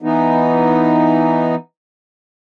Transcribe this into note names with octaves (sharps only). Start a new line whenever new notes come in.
E3 B3 D#4